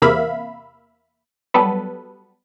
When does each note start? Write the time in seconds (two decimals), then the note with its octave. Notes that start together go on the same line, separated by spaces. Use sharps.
0.02 E2 C3 A#3 E5 F5 B5
1.54 F#3 G3 B3 A4 B4